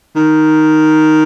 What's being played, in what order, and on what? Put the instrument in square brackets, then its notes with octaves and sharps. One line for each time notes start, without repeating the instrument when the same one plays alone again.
[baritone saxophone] D#3